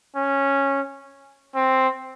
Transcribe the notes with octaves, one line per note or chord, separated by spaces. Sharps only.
C#4
C4